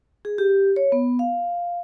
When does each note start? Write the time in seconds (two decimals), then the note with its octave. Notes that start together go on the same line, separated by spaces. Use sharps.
0.25 G#4
0.38 G4
0.76 C#5
0.92 B3
1.19 F5